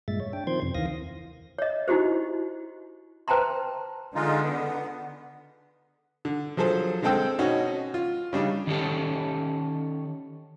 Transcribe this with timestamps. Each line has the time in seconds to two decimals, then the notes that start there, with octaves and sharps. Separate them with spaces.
0.08 G2 A#2 G#3 E5 A6
0.20 C#5
0.33 D4 G5
0.47 D#3 F3 C4 C5 C6 G#6
0.62 F2 C3
0.75 D#2 D#3 E3 F5 D#6 A#6
1.59 C#5 D#5
1.88 D#4 E4 F#4 G4 C5
3.28 B4 C5 G5 A5 A#5 C6
4.15 D3 G#3 D#4 F4
4.43 B3
6.25 D3
6.57 F3 F#3 G#4 A4 C5
7.02 D3 G#3 C4 A4 G5 E6
7.39 B2 C#4 D#4 F#4
7.94 F4
8.33 C#3 G3 D4 D#4
8.67 D#3 C#4 G4 A4